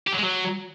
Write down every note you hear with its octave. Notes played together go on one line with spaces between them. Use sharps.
G4
F#3
G#3
F#3